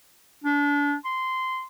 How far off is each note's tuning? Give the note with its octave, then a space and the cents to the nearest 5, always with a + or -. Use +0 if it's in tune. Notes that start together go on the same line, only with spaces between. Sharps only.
D4 -30
C6 -15